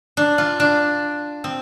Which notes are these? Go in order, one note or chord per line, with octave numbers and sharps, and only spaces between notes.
D4
F4
D4
C4